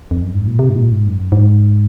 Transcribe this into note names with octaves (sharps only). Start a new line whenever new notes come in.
F2
F#2
G#2
A#2
C3
G#2
A#2
G#2
F#2
G#2